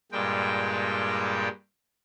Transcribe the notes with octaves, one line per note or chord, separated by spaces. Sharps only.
G2 A#2 G3 G#3 G5